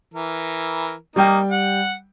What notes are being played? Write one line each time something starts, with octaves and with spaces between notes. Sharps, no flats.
E3 A#4
G3 A#3 D#4 G5
F#5